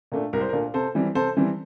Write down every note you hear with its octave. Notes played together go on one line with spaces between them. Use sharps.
A#2 A3 D4
C2 A#4
C5
A#4
A#2 A3 D4
C3 A4 C5
E3 G3 C4
C3 A4 C5
E3 G3 C4